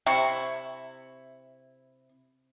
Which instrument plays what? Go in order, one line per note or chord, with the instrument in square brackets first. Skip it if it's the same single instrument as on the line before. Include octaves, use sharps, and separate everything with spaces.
[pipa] C3 E4 C#6